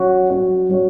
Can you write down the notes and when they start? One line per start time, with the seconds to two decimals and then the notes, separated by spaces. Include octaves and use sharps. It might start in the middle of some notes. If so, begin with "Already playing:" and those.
Already playing: F#3 C#4 F#4 C#5
0.30 F#3 C#4 F#4 C#5
0.69 F#3 C#4 F#4 C#5